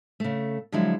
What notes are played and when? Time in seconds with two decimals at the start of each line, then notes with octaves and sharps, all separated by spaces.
0.20 C#3 A3
0.72 D3 F3 F#3 G#3 E4